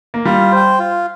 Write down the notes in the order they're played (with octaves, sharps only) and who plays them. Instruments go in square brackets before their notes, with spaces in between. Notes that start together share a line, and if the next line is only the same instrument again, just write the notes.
[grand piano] A#3
[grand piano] G3 [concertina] F4
[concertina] C5 G5
F4